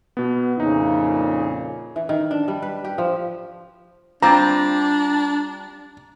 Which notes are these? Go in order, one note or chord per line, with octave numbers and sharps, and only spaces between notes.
B2 B3
F2 A#2 C#3 D#4 E4
E3
D#3
D4
G3
B4
G4
F3
G3 C4 D4 F4 A#5